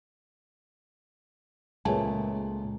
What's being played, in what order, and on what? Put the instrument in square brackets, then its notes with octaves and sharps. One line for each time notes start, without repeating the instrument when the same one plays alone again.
[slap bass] C#2 [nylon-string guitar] A#2 A3 [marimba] G#4 B4 C#5 [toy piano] G#5 A5